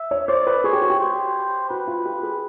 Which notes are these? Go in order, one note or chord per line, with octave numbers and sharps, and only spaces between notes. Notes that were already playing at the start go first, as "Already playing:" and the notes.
Already playing: E5
C#5
C5 D5
B4
G#4 C#5
G4
F#4
G4
C5
F#4 B4
F4
G4
G#4